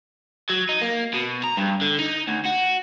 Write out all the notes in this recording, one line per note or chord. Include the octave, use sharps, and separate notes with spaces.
F#3
D#4
A#3
B2
A#5
G2
D3
D#4
D2
F#4